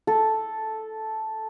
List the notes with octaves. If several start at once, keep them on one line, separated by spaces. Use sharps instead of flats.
A4